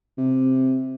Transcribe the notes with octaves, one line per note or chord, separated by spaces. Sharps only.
C3